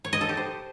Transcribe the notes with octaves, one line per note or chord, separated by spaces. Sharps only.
C#5
D#5
A4
G4
C5